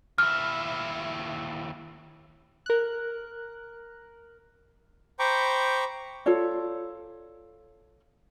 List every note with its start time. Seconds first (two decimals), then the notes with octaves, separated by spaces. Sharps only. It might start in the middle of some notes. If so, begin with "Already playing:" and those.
0.18 D#2 E4 F6
2.66 A#4 F#6
5.19 C5 G5 A#5 B5 C#6 D6
6.26 F4 A4 C#5 D5